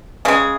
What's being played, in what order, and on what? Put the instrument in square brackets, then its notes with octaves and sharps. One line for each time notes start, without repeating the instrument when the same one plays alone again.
[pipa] C#3 G#3 G#4